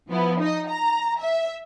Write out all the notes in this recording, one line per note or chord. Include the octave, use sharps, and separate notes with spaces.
F3 B3 E4
D#4 D#5
A#5
E5